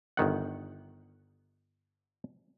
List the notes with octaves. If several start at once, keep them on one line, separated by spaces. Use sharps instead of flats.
G1 D#3 F#5